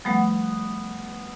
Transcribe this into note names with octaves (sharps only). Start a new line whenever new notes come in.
F3 G3 A3 B3